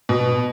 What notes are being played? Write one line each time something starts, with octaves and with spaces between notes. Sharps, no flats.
B2